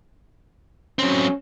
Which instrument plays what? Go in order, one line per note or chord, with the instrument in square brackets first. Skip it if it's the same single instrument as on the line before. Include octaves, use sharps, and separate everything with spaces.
[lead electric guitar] F#3 C4 [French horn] C#4